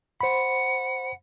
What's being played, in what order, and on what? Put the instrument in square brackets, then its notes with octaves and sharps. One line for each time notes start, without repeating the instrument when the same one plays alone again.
[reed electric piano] C5 B5 [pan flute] F#5